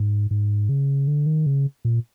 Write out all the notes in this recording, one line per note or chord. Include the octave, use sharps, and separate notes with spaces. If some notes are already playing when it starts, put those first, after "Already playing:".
Already playing: G#2
G#2
C#3
D3
D#3
C#3
A#2